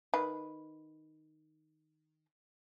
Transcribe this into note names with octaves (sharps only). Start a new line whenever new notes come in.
D#3 B4